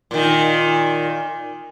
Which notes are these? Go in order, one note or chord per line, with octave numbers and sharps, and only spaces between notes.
A#2 D#3